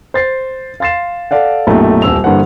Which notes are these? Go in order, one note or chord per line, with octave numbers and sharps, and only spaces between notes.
C5 A6 C7
F5 C6 A6 C7 E7
A4 D5 F5 F#5
B1 F#2 A#2 A3 D#4 G4
D#1 C2 E6 F7
G2 D3 E3 A#3 C5 F#5